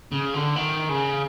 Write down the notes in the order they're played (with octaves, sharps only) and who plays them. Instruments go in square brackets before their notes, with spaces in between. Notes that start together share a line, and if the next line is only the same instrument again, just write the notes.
[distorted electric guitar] C#3
D3
D#3
C#3